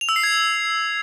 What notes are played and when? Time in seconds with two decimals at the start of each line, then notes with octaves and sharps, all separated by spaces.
0.01 F7
0.09 E6
0.16 C7
0.23 G#6